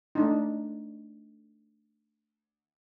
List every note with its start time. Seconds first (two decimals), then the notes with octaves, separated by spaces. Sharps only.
0.15 A3 D4 D#4